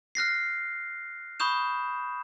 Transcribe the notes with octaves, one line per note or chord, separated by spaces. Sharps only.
F6 F#6 A#6 C7
B5 C#6 D#6 G6 E7